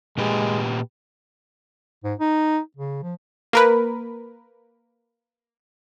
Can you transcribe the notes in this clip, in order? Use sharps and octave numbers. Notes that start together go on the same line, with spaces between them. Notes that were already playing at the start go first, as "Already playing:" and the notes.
A#2 G#3 G4 B4
G#2
D#4
C#3
F3
A#3 A#4 B4